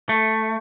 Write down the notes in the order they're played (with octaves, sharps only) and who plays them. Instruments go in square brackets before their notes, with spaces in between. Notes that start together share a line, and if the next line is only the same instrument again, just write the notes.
[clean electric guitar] A3